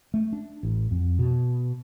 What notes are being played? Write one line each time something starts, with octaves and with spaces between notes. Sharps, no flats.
A3
D4
A1
F2
B2